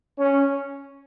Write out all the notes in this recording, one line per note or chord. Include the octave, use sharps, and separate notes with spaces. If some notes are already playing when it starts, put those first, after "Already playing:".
C#4